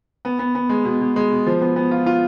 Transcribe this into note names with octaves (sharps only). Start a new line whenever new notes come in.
B3
B3
B3
G#3
B2
B2
G#3
B2
F3
B3
B3
F4
F4